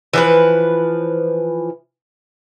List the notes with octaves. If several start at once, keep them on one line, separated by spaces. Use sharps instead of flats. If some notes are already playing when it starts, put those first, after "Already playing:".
E3 F3 B4